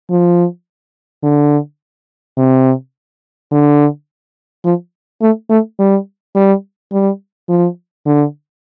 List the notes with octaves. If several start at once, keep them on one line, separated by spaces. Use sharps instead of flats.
F3
D3
C3
D3
F3
A3
A3
G3
G3
G3
F3
D3